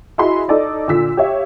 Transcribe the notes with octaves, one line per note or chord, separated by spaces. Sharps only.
E4 F#4 G#4 D#5 B5 C6
D#4 A4 D5 D#5
A#2 D3 E6 B6
G4 C#5 E5 F5